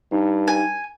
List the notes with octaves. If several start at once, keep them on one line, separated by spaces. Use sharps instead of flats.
G2 D#4
G#5